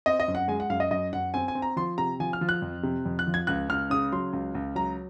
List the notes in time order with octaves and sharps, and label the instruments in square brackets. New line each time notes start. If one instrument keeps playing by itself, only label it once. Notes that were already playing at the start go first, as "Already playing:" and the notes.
[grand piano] C4 D#5
D#5
F#2
F#5
G#3 G#5
F#5
F#2 F5
D#5
F#2 D#5
F#2 F#5
C4 G#5
G#5
C4
A#5
F3 C6
C3 A#5
F3 G#5
F6
F3
F#6
F2
C3
F2
F#6
F3
G#6
C#2 F#6
C#2 F6
C#3 D#6
F#3 C6
C#2
C#2
F#3 A#5